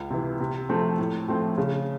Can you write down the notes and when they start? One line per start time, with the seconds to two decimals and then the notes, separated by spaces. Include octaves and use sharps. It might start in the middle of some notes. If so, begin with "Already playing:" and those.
Already playing: C#2
0.11 C3 E3
0.40 C3
0.69 F3 A3 C4
0.99 A2
1.28 F3 A3 C4
1.58 C#3